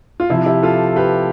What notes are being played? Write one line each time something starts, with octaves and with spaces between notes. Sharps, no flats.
F4
C3 F3 E4
E4 G4
F4 A4
G4 B4